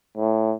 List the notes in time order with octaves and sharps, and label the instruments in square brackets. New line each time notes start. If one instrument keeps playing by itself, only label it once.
[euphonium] A2